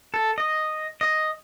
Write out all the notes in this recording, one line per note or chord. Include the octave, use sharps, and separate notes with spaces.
A4
D#5
D#5